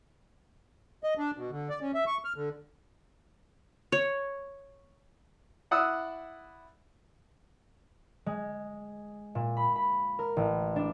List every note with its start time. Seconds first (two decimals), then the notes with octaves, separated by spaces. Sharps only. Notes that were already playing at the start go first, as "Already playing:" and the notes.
1.04 D#5
1.18 D4
1.37 B2
1.51 D3
1.69 D5
1.82 C#4
1.94 E5
2.07 C#6
2.25 F6
2.36 D3
3.92 C#5
5.71 E4 D5 F#5 D#6 E6
8.26 G#3
9.35 A#2
9.57 B5
9.76 B5
10.19 A#4
10.37 A1
10.76 D4